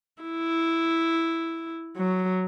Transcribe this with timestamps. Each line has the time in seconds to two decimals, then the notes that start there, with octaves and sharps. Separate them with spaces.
0.23 E4
1.97 F#3